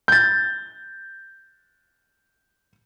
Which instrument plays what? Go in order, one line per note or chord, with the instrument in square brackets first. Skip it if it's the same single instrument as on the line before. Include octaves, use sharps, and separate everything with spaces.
[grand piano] G6 A6